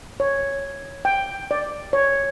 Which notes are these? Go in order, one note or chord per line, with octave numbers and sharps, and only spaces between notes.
C#5
G5
D5
C#5